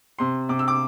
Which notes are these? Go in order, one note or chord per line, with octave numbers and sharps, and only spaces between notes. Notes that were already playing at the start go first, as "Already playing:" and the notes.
C3 C6
C3 D6
E6
D6